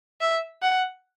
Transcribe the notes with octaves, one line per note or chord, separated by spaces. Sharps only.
E5
F#5